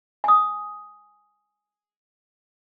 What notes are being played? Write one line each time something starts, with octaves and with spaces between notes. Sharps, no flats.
G#5 D#6